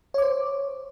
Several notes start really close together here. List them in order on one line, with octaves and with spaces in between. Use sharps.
C#5 D6 C5